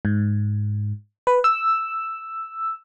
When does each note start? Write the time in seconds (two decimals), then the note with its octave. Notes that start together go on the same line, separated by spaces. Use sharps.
0.05 G#2
1.27 B4
1.44 E6